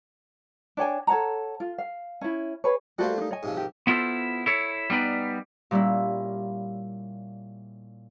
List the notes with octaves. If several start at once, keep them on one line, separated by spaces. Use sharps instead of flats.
D4 C#5 G5 G#5
A4 C#5 F#5 A#5
F4
F5
C#4 E4
G#4 B4 C#5
G3 A3 A#3 F#4 A4 C5
D4 D#4
C#5 D#5 G#5
G#2 C3 F3
G4 A#4
B3 E4 F4 G4 A4 C5
E4 A4 C#5
G3 B3 D#4 B4 D5
A#2 G3 A#3 C#4 E4